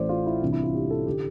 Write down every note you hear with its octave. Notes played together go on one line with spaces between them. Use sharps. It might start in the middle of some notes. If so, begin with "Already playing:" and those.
Already playing: A1 A2 E3 C5 D5
F4
E4
C2 C3 E3 D4
E4
F4
G4
A4
D3 G4